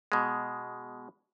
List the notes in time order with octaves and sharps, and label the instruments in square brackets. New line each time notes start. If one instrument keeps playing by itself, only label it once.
[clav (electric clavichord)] B2 G#3